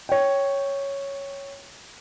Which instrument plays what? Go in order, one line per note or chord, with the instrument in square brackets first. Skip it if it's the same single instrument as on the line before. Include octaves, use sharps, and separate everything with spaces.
[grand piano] C#5 G5